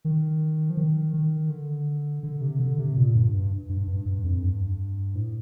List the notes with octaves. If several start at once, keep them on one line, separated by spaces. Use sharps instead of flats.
D#3
F3
D#3
D#3
D3
D3
C3
D3
C3
A#2
G2
G2
G2
G2
G2
F2
G2
A2